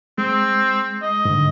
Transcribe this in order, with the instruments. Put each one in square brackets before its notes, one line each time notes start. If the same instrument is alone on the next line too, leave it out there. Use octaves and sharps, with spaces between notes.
[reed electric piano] G#3 [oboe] C4
[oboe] D#5
[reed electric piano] G#2 D3